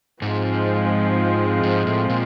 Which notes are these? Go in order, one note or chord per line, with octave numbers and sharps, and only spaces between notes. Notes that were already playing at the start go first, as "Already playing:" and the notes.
G#2 F3 G#3 C4
G#2
A2
A#2